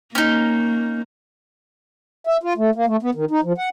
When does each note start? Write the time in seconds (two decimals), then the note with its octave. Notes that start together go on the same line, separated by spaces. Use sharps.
0.15 A#3 C#4 D#4
2.27 E5
2.43 F4
2.57 A3
2.75 A#3
2.87 A3
3.03 B3
3.15 D#3
3.31 D#4
3.44 F3
3.58 F#5